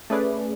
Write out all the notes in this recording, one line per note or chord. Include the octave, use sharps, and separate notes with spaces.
A3 C#4 G#4 B4 D5